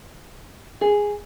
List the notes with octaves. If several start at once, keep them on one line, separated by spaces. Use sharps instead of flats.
G#4